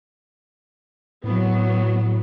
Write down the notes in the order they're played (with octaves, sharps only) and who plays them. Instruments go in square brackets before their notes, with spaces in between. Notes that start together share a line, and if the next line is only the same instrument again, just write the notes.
[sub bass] A2 [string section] F#3 B3